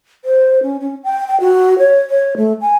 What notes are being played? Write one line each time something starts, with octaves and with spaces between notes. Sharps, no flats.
C5
C#4
C#4
G5
G5
F#4
C#5
C#5
A3
G#5